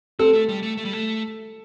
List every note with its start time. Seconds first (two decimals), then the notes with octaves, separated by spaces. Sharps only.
0.19 C4 A4
0.33 A3
0.49 G3
0.63 A3
0.77 A3
0.85 G3
0.93 A3